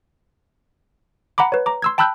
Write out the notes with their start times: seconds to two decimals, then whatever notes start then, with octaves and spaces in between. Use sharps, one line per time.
1.38 F#5 A#5 B5 D6
1.52 B4 C#5
1.66 A#5 D6
1.82 C6 E6 G#6
1.98 G5 A5 B5 E6 F#6 G6